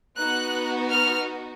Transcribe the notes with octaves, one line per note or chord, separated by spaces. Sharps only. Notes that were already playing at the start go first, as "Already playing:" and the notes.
B3 D#4 F#4 F#6
F6